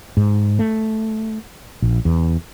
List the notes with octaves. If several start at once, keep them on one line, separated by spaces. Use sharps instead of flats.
G#2
A3
A#1
E2